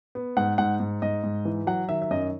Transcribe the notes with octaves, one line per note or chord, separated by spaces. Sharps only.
B3
G#2 F#5
G#2 F#5
G#2
G#2 D#5
G#2
E3
F#3 F#5
D#3 E5
E5
F#2 D#5